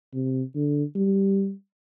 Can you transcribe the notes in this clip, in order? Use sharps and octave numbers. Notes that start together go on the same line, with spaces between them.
C3
D3
G3